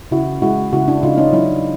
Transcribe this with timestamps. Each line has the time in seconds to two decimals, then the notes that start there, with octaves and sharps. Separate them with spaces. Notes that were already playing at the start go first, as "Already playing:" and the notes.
0.11 C#3 E4 F#4
0.42 G#3 E4 F#4
0.73 C#3 E4 F#4
0.88 D4 E4
1.03 C#3 D#4 F4
1.18 C#4 D#4
1.33 F#3 D4 E4